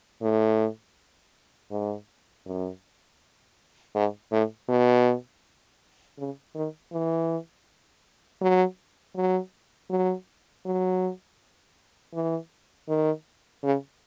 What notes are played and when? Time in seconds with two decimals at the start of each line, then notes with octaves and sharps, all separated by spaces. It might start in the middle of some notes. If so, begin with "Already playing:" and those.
0.22 A2
1.71 G#2
2.46 F#2
3.95 G#2
4.31 A2
4.69 B2
6.18 C#3
6.55 D#3
6.92 E3
8.41 F#3
9.16 F#3
9.90 F#3
10.65 F#3
12.14 E3
12.89 D#3
13.63 C#3